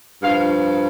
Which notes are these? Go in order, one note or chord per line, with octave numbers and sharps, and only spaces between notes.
G2 F3 F5